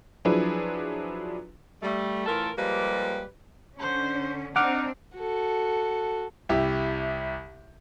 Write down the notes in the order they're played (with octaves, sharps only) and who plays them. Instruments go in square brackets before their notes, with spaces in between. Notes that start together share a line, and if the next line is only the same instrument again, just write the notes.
[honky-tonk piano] F3 F#3 D4 E4 G#4 B4
[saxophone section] G3 A3
A2 E3 F4 A4 A#4
F3 G3 G#3 A#3 G4 B4
[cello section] D3 C#4 [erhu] C5
[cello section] C4 D4 [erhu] D#4 [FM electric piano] F#5 D6 F6
[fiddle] F#4 A4
[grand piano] C2 E4 G4